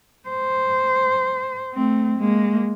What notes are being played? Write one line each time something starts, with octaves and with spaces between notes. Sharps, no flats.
C5
A3 C4
G#3 A#3